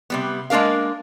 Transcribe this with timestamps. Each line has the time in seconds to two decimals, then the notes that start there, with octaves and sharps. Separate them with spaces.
0.10 C3 G3 B3
0.50 G#3 A#3 D4 A#4 F5